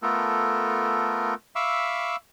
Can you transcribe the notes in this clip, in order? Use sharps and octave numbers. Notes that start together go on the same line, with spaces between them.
A3 B3 F4 A4 A#4
E5 F5 B5 C#6 D6 E6